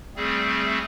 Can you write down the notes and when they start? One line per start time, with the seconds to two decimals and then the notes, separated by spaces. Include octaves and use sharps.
0.16 G3 A3 C4 G#4